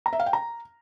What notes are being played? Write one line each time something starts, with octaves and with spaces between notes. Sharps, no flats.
A#5
E5
F5
G5
A#5